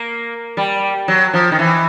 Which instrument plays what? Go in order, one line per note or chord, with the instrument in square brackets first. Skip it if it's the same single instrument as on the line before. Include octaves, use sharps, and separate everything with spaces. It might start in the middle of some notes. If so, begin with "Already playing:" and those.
Already playing: [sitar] A#3
G3
F#3
F3
D#3
E3